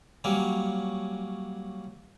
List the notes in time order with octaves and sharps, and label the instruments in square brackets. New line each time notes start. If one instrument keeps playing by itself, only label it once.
[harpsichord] F#3 G3 A#3 C#4